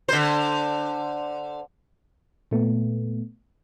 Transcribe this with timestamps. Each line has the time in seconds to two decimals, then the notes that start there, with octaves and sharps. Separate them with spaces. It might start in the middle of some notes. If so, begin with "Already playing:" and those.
0.09 D3 C5
2.51 A#2 A3 B3